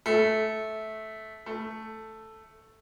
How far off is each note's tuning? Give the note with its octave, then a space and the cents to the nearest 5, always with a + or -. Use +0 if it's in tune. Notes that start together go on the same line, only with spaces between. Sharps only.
A3 -15
A3 +0